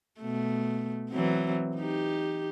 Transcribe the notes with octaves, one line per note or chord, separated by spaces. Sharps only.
B2 A3
E3 F#3 C4
D#4 G4